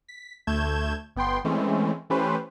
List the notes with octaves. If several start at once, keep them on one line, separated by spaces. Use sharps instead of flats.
B6
D2 A3 G6 G#6 E7
G1 B3 G5 C6
E3 G#3 A3 C4 C#4
E3 A3 C#4 G4 B4 C5